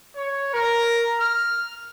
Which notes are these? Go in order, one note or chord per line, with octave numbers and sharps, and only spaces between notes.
C#5
A#4
F6